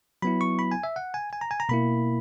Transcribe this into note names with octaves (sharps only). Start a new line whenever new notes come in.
F#3 B3 E4 B5
C#6
B5
G#5
E5
F#5
G#5
G#5
A#5
G#5
A#5
B2 A#3 E4 B5